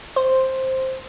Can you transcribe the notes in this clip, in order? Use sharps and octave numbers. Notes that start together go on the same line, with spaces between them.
C5